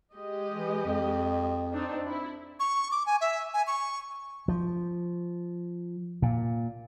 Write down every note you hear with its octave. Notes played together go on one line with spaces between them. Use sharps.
G#3 G4 D#5
E3
F2
C4 D4 D#4
E4
C#6
D6
G#5
E5
G#5
C#6
F3
A#2